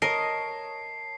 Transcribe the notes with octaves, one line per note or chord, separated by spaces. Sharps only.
A#4 C#5 D#5 A5 C7